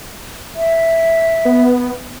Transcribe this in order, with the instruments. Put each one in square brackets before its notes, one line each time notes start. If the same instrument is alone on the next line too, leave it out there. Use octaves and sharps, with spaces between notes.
[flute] E5
[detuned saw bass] B3